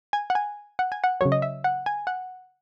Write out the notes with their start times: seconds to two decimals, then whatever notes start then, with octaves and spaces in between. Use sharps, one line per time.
0.13 G#5
0.30 F#5
0.35 G#5
0.79 F#5
0.92 G#5
1.04 F#5
1.21 C#3 F#3 C#5
1.32 D#5
1.42 E5
1.64 F#5
1.86 G#5
2.07 F#5